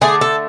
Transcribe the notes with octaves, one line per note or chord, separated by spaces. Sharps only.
D3 A3 D4 G#4
A4